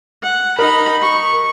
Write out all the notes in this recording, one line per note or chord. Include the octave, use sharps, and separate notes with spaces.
F#5
D#4 A#4 B5
C#6